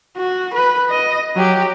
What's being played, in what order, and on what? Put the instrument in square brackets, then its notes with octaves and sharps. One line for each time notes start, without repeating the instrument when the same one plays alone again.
[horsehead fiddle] F#4
B4
D#5
F#3 G4